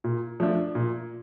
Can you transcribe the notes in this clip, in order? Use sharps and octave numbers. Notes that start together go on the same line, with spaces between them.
A#2
F3 A3 D4
A#2